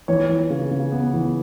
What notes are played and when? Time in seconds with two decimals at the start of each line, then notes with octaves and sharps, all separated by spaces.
0.08 E3 C#5
0.29 E3
0.50 C#3
0.71 C#3
0.92 B3
1.13 E3